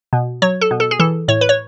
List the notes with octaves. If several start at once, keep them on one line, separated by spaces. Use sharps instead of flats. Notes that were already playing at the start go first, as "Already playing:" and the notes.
B2
F#3 C#5
A4
B2
A4
G#4
E3 A4
A2 C#5
B4
C#5